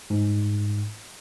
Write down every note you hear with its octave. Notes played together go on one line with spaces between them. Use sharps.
G#2